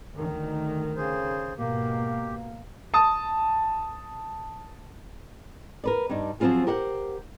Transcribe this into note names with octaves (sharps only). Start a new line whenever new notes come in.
D2 D#3
C#3 G#4 C5
G#2 B2 A#3 G4
A5 D#6
A#4 B4 D5
G2 D4 D#4
F3 F#3 B3 C4 F4 G#4
G4 A#4 C5 F#5